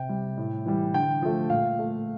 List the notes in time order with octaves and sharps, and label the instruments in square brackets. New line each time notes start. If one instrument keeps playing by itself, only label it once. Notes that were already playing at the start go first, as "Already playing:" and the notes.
Already playing: [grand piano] C3 G5
G3
A2
E3 G3
D3 G5
F3 A3
A#2 F5
A3